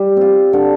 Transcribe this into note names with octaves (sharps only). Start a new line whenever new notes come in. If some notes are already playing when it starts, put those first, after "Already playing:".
Already playing: G3
C4 F4
D3